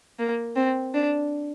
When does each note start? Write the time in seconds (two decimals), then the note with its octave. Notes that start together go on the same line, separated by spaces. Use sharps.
0.19 A#3
0.56 C4
0.94 D4